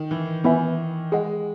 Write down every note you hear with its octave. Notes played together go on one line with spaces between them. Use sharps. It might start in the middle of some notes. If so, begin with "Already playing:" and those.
Already playing: D#3
E3
E3 B3 E4 B4 E5 G#5
G#3 G#4 D#5 F#5